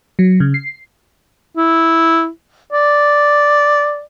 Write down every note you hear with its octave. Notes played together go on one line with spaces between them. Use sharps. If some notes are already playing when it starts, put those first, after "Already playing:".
F#3
C#3
C7
E4
D5